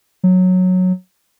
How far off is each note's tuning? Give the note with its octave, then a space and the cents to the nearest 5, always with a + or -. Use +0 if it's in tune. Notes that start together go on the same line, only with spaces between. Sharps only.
F#3 -10